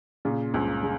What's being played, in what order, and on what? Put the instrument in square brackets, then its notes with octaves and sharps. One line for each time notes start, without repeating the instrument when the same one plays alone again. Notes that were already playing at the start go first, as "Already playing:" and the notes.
[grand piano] A#2 [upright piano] C#3
[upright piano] C#2 [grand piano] G2
[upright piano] C#3